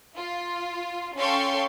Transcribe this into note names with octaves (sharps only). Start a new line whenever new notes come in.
F4
C#4 A4 F5 G5 C6 C#6